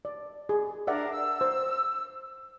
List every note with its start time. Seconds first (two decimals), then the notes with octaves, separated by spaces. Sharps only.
0.05 D5
0.49 G#4
0.87 D4 A#4 D5 E5 F#5
1.11 E6
1.41 C5